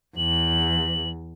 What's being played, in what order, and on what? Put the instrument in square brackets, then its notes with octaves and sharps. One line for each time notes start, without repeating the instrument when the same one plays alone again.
[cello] E2 [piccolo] F#7